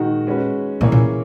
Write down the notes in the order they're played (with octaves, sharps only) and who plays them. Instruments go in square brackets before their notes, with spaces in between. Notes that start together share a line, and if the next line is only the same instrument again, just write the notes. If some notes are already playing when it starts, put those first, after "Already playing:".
Already playing: [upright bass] A#2 [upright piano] D#3 G#3 D#4 F#4
[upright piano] G#3 C#4 F#4 B4
[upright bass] A#2 [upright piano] E3 A#3 C#4 G#4 C#5
[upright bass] A#2